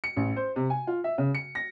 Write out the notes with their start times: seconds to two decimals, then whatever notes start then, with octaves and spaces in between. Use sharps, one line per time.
0.04 C#7
0.17 A1
0.36 C5
0.56 C3
0.70 G#5
0.87 F4
1.04 E5
1.18 C#3
1.35 C#7
1.55 A#6